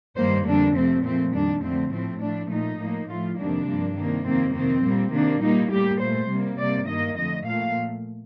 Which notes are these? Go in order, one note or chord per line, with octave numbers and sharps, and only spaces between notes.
G2 D#3 G3 A#3 C5
F2 D3 G3 A#3 D4
C3 F3 A3 C4
A#2 F3 A3 C4
F2 D#3 G3 D4
F2 D3 A3 C4
A2 F3 A3 C4
A2 F3 A3 D4
A#2 A3 D#4
A2 F3 A#3
A2 F3 A3 F4
F2 C3 D#3 G3 A#3 D4
G2 F3 A#3
C3 D#3 A#3
F2 D#3 A#3 C4
C3 D#3 A#3 C4
A#2 G3 A#3
C3 D#3 A#3 D4
A#2 G3 A#3 D#4
A2 G3 A#3 G4
A#2 A3 C5
C3 G3 A#3
C3 G3 A#3 D5
G2 D#3 A#3 D#5
F2 D3 A3 D#5
A#2 F3 A3 F5